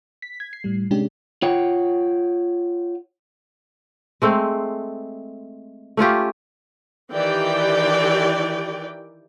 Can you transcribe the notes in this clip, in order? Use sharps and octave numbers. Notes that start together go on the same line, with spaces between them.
B6
G#6
C7
A2 G3
C3 G#3 C#4 D4 G4
F4 C#5 F#5 G5
G#3 A3 C4
A3 C#4 F4 G4
D#3 E3 G4 D5 G5